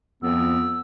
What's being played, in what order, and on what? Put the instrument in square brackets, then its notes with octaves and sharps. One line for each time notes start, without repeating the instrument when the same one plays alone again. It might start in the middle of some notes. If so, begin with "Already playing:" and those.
[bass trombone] F2 [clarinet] B3 [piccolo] E6